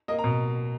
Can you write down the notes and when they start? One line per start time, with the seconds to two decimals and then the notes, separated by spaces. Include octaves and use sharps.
0.08 A#3 D#5
0.19 A#5
0.24 B2